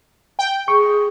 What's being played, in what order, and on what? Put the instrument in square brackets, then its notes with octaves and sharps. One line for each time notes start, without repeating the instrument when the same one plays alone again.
[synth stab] G5
[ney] G#4 [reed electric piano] C#6